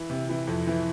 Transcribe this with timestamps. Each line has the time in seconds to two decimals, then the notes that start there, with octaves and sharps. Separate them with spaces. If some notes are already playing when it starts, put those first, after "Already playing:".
Already playing: E3
0.10 C3
0.29 E3
0.47 F2
0.67 E3